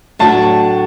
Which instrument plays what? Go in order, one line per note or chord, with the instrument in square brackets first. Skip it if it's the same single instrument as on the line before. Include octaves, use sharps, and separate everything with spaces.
[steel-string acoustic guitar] A2 F#3 D4 F#4 [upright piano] A5